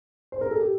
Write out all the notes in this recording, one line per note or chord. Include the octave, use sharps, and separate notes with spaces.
C5
A#4
A4
G4